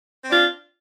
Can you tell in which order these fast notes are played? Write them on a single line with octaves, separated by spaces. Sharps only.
C4 D4 F4